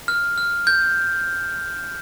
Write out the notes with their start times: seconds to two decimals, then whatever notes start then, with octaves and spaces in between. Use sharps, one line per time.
0.08 F6
0.38 F6
0.67 G6